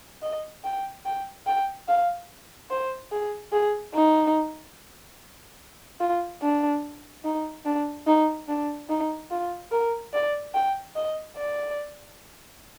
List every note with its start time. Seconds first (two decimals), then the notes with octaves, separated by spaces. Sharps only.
0.22 D#5
0.64 G5
1.05 G5
1.47 G5
1.88 F5
2.71 C5
3.12 G#4
3.52 G#4
3.94 D#4
6.00 F4
6.42 D4
7.25 D#4
7.65 D4
8.07 D#4
8.48 D4
8.89 D#4
9.31 F4
9.71 A#4
10.14 D5
10.54 G5
10.96 D#5
11.37 D5